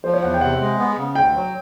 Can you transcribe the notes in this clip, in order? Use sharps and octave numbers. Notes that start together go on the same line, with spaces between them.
F3 C5
C#5
E2 F#5
G5
C3 F#5
G#3
B3
C#3
D2 G5
F#3